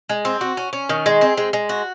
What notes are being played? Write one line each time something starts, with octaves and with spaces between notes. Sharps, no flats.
G#3
C4
F#4
C#4
C#4
D#3
G#3
C4
G#3
G#3
F#4